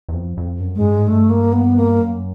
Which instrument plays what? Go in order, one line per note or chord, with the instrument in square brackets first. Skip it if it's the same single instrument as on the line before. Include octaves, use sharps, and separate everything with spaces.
[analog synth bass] E2
F2
F2
F#2
[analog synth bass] G#2 [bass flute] G#3
[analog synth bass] G2
G#2
[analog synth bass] G2 [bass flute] A3
[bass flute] A#3
B3
A#3
[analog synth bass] F#2